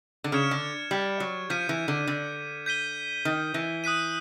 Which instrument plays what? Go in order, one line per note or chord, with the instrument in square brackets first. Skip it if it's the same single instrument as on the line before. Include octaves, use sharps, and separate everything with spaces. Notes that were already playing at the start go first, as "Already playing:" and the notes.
[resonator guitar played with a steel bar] D3
[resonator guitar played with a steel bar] C#3 [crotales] F6 G#6 C#7 E7
[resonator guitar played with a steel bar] D3
G3
F#3
[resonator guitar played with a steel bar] F3 [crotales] G6 B6 D#7
[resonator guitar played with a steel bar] E3
D3
D3
[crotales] G6 B6 D#7 G7
[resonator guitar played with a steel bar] D#3
E3
[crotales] D#6 F#6 B6 D#7